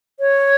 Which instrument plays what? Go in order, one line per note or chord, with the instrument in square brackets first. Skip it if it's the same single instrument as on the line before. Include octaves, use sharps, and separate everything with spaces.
[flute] C#5